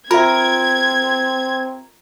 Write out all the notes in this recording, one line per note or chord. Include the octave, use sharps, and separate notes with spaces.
C4 F4 A#4 E5 G#6